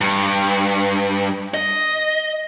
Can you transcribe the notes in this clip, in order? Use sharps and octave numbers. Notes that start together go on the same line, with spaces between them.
G2
D#5